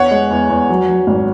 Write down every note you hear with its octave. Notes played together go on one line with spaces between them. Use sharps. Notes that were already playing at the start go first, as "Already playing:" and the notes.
Already playing: E2 C#5 F#5
G#3
E2
E2
F#3
F#3
G#1